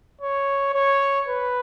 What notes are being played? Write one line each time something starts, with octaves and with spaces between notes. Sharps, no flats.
C#5
C#5
B4